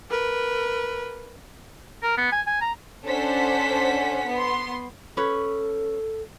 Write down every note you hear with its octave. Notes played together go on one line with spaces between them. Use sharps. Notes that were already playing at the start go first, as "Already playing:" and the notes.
A#4 B4
A#4
B3
G#5
G#5
A#5
C#4 D4 A4 C5 F#5 B6
B3 C6
C#4 A4 B4 C#5